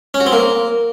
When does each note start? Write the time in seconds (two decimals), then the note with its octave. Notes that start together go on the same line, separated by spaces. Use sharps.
0.14 C#4
0.20 F#4
0.26 C4
0.32 A#3